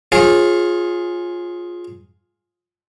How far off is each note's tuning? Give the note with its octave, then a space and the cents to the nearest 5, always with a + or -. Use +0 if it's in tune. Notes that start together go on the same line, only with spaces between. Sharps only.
F4 +10 G#4 +0 C#5 -40